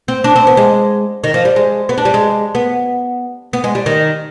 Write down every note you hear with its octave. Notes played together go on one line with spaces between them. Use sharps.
C4
D4
C4
B3
G#3
D#3
F3
G3
G#3
B3
D4
G3
G#3
B3
B3
G#3
G3
D#3